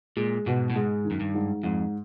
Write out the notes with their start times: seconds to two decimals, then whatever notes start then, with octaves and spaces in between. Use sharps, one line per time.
0.17 A#2 G#3
0.46 G#2 B2
0.70 A2
0.76 G#2 G#3
1.05 D#3
1.11 F#2
1.20 G2
1.34 G#2
1.63 F2 G#2